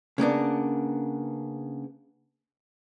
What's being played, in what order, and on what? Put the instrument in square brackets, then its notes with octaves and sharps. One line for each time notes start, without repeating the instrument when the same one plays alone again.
[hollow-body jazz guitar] C#3 A#3 B3 D4